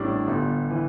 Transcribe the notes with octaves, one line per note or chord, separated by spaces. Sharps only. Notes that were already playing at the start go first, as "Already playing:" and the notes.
Already playing: A1 A2 G3 D4
G1
E3